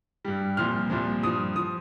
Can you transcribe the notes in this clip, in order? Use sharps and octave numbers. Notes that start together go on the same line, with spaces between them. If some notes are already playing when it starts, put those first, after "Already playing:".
G2 G3
C2 A#2 F3 F6
C2 A#2 F3
G2 F3 D#6
F3 D#6